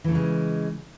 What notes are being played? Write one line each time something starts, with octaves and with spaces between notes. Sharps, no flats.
C#3 E3 G#3 A3